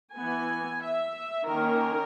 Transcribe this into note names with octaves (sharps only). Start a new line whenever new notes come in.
E3 B3 G#5
E5
D#3 A#3 C#4 A#4